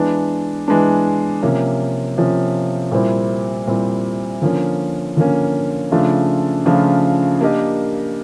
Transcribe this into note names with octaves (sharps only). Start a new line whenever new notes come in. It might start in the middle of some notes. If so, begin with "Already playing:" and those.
Already playing: E3 G#3 B3 D4
E3 G#3 B3 D4
C3 F3 A#3 C#4
C3 F3 A#3 C#4
A#2 G3 C4 E4
A#2 G3 C4 E4
D3 F3 A#3 C#4
D3 F3 A#3 C#4
C#3 F3 A3 D4 F4
C#3 F3 A3 D4 F4
A#3 D4 G4 A#4 D#5